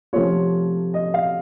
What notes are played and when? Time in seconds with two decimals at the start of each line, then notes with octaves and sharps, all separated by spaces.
0.13 C3 F3 A3 C#4 F4 C#5
0.94 D#5
1.14 F5